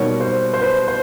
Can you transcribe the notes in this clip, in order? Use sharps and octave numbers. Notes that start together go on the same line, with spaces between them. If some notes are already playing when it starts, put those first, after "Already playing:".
Already playing: B2 G3 A#3 D#4 F#4 C#5
C5
C5
B4
C5